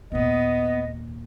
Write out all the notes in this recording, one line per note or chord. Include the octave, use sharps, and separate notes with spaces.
D#2 A#2 B3 D#5